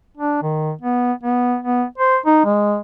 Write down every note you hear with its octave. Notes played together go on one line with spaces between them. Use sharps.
D4
D#3
B3
B3
B3
C5
D#4
G#3